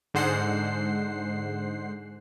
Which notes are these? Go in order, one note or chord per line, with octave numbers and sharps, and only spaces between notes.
G#2 D3 G#3 C5 F#5 C7